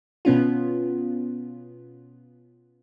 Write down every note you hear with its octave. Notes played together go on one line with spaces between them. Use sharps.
B2 B3 C#4 F4